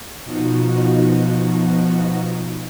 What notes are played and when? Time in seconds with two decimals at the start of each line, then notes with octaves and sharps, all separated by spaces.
0.24 B2 F3 D#4 F#4